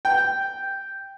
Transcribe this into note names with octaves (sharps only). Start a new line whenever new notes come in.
G5